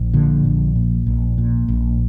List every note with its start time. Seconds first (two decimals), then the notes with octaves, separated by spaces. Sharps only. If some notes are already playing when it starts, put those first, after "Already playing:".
Already playing: A#1
0.13 A#2 D3 F3
0.44 A#1
0.75 A#2
1.06 A#1
1.38 A#2
1.68 A#1